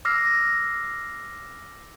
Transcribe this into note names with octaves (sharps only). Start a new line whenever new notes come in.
D6 E6 F6 A#6 C7